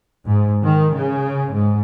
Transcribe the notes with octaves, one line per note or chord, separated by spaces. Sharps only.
G#2
D#3
C#3
G#2